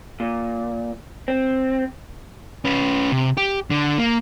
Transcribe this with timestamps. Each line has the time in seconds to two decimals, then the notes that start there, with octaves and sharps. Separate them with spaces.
0.20 A#2
1.28 C4
2.65 C#4 B4
3.12 C3
3.37 G4
3.70 D3
3.98 A#3